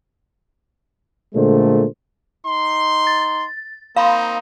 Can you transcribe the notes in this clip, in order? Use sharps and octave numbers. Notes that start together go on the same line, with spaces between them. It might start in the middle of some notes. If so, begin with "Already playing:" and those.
A#2 D3 G#3 A3 C5
D#4 C6
A6
A#3 C4 D#4 F5 B5 C6